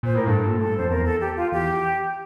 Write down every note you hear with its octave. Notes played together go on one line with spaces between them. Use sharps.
A#2 C5
A2 A#4
G2 A4
A#2
A2 A4
G2
F2 C5
E2 A#4
A4
G4
F4
E2 G4